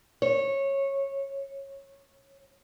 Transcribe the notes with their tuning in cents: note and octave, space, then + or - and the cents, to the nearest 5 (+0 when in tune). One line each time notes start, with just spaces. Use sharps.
C#5 -15